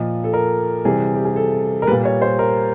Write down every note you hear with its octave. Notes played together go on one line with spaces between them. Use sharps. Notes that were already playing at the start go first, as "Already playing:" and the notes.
Already playing: A#2 F3 D#5
A4
A#4
C3 E3 G3 G#4
G4
G#4
A4
A#4
A#2 G3 B4
C#5
C5
A#4